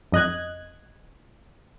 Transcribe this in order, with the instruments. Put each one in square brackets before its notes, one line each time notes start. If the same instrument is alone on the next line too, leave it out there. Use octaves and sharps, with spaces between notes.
[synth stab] F2 D#5 F#6 G#6